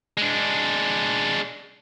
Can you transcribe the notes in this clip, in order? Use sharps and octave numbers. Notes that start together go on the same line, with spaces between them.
G#3 D4